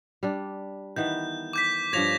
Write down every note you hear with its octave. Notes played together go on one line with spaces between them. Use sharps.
G3 D4
D#3 E3 B3 G6
D6 G6 B6
G2 F3 C#5 G#6 A#6 F7